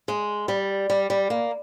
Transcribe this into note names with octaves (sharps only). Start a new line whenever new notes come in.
G#3
G3
G3
G3
A#3